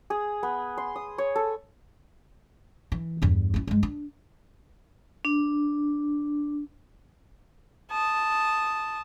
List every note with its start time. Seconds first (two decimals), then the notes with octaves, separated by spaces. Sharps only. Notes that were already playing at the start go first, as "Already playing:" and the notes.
0.10 G#4
0.43 B3
0.78 C6
0.96 D#6
1.18 C#5
1.36 A4
2.92 E3
3.22 E2 G2
3.54 C#4 E4
3.67 G2 G#3
3.83 D4
5.25 D4
7.91 A5 D#6